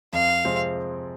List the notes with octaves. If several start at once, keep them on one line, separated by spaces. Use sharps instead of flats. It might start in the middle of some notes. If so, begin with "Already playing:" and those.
F2 F5
C3 F3 G#3 C4